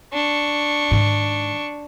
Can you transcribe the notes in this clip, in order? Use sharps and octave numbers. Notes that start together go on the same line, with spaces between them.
D4 C#6
G#2 D#3